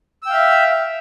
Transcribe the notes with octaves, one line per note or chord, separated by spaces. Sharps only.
E5 F5 G5 E6